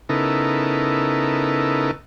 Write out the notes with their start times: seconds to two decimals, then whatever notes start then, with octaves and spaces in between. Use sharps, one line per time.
0.09 C#3 B3 D#4 E4 A4 A#4